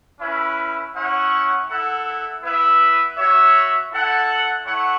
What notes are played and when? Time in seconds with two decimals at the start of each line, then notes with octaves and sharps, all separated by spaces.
0.20 C#4 E4 B4 E5
0.94 C#4 E4 C#5 F#5
1.68 E4 A4 F#5
2.43 B3 E4 B4 E5
3.17 F#4 C#5 E5
3.91 E4 A4 F#5
4.65 A3 E4 C#5 F#5